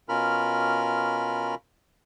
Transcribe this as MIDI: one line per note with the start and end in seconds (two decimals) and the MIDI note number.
0.09 1.55 47
0.09 1.55 61
0.09 1.55 65
0.09 1.55 70
0.09 1.55 83
0.09 1.55 89